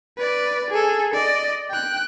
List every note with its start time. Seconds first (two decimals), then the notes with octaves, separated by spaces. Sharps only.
0.17 B4 D5
0.70 G#4 A4
1.14 D5 D#5
1.70 G5 F#6